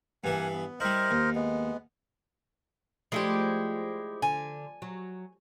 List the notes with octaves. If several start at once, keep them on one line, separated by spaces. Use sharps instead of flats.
G2 E3 A#3 F#5 G#5
B3
G3 E4 A#4 C5 D#5
D#2
G#3 B3
F3 G#3 A3 D4 E4 G4
D3 G#5
F#3